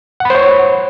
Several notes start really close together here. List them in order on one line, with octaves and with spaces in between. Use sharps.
F#5 B5 C5 C#5